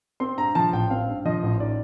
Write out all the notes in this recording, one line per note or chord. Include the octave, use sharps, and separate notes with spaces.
C4 C6
G2 A#5
F3 A5
A1 G5
C4 F5
G2
F3 D#5
A1
D#4 D5